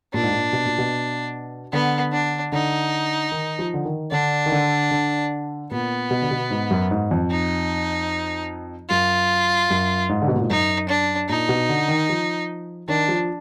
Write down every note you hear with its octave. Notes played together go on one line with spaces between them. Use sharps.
A#2 D4
G#2
A#2
B2
A#2
B2
D3 B3
D4
D3 D#4
D#3
F3
D3
D#3
D3 D4
D#3
D3
D3
A#2 B3
B2
D3
B2
G#2
F#2
G#2
F2
D#4
F#2 F4
F#2
G#2
D3
B2
A#2
G#2
F#2 D#4
D4
A#2 D#4
B2
D3
D#3
F3
D#3 D4
F3